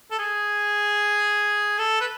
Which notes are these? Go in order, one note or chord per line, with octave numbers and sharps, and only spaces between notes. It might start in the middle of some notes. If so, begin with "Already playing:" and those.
A4
G#4
A4
B4